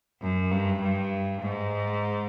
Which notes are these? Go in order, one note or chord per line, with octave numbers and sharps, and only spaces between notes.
F#2
G2
G2
G#2